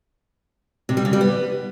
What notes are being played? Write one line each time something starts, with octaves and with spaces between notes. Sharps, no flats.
C3
G3
C#3
G3
B3